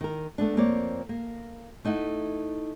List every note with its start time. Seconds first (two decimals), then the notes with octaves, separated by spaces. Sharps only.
0.01 D#3 A#4
0.38 A3 B3 D4
0.57 F2 A#3 C4 C#5 D5
1.09 A#3
1.85 A3 D#4 E4 F#5